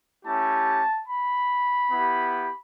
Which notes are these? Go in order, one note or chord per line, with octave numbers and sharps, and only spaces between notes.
A3 C#4 E4 G4 A5
B5
B3 E4 G4